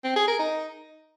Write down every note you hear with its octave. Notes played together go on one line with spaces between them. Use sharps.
C4
G#4
A#4
D#4